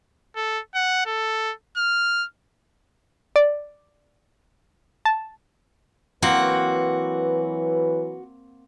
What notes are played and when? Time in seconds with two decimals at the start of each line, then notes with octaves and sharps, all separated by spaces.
0.36 A4
0.75 F#5
1.06 A4
1.77 F6
3.36 D5
5.05 A5
6.22 E3 F#3 A#3 C4 F#4 B4 F#5